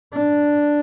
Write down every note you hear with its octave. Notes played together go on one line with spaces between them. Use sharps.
D4